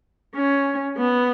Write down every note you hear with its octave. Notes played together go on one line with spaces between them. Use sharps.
C#4
B3